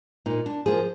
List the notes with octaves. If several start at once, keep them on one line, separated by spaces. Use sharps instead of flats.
A#2 D#4
D4
F3 A#3 G#4